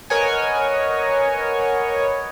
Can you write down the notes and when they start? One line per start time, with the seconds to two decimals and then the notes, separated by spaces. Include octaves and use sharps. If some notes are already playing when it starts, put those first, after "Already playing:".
0.10 A#4 B4 C#5 D#5 F#5 G#5